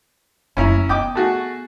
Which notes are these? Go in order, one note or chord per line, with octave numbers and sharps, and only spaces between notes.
F#1 A3 C#4 E4 A#5
B3 D#5 G5 D6
A3 F#4 G#4